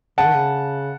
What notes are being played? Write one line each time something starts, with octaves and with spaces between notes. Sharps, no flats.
C#3 F#5 A5
D#3
C#3